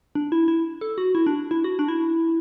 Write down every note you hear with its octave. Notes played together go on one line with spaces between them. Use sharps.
D4
E4
E4
A4
F#4
E4
D4
E4
F#4
D4
E4